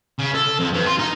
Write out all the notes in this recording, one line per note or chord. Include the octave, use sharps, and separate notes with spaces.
C#3
A4
F2
G2
F4
D#4